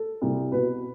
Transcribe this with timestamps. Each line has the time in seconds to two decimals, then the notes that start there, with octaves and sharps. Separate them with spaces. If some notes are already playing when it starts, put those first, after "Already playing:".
Already playing: A4
0.21 C2
0.52 B2 B4